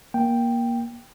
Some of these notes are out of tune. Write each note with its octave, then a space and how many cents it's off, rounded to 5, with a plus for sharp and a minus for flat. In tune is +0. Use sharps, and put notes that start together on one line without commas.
A#3 +20 G5 +0